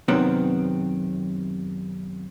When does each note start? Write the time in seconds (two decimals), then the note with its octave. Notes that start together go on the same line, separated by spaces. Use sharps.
0.08 F#2 C3 D#3 B3 C4